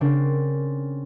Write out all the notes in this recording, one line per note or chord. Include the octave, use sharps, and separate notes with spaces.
C#3 C4 D4 A#4 C7